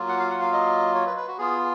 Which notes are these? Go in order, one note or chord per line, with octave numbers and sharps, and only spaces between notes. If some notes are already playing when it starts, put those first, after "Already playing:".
Already playing: F#3 A#3 F4
F#5
F5
F#5
F5
D#5
C#5
B4
B4
F#4
B3 F4 G#4